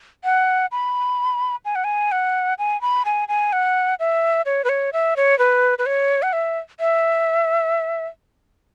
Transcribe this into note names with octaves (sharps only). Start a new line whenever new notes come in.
F#5
B5
G#5
F#5
G#5
F#5
G#5
B5
G#5
G#5
F#5
E5
C#5
B4
C#5
E5
C#5
B4
B4
C#5
F#5
E5
E5